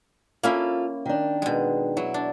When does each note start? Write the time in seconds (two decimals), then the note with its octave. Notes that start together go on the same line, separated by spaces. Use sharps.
0.43 A#3 C#4 E4 F4 A4 F5
1.06 D#3 D4
1.42 B2 G#3
1.97 F#3 E4
2.14 D4